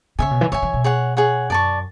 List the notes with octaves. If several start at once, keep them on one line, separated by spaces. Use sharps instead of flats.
C#3 C#5 E5 G#5
B2
E3
E3 C#5 E5 G#5
E3
B2
G#4 C#5 F#5
G#4 C#5 F#5
F#2 D5 A5 C#6